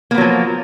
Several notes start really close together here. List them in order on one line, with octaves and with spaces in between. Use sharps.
A#3 B3 F#3 F3